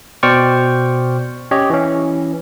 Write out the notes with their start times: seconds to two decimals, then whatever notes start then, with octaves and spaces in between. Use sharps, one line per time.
0.23 B2 C5 D5 G5 C#6 F6
1.51 C#4 G4 C#5 D#5
1.70 E3 C#4